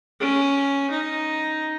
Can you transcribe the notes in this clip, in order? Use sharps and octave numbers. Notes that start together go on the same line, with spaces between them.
C#4
D#4